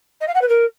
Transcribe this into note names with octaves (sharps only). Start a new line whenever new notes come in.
D#5
F5
F#5
B4
A#4